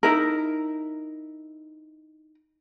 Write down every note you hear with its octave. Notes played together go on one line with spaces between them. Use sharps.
D#4 E4 A#4